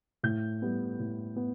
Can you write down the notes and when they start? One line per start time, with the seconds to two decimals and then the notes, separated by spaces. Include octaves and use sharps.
0.23 A2 G6
0.62 G3 B3
0.99 A2
1.36 B3